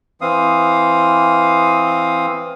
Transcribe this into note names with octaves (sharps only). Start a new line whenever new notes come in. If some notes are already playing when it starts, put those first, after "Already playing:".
E3 C4 F5 D#6